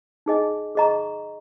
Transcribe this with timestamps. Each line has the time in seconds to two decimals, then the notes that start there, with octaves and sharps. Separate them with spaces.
0.26 D#4 G#4 D#5 G#5
0.75 G#4 D#5 A#5 C#6